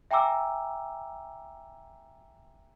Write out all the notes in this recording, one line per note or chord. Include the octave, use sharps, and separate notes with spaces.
E5 G5 G#5 A#5 D6 E6